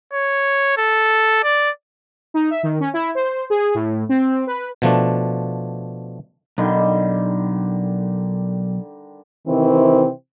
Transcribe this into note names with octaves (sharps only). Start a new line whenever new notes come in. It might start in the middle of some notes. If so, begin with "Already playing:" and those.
C#5
A4
D5
D#4
E5
D#3
C#4
E4
C5
G#4
A2
C4
B4
B2 F3 A3 D4
B1 D3 D#3 G3
C3 D#3 E3 C4